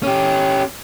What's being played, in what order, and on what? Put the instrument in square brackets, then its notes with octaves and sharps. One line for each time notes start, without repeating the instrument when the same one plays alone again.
[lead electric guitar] C#4 G4